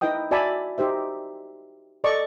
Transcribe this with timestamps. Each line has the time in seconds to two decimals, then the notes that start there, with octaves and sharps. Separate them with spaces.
0.01 D#4 E4 B4 D#5 G5 D#6
0.31 F#4 D5 E5 G#5 A5 B5
0.78 D#4 G4 C5 E5
2.04 A4 D5 D#5 C#6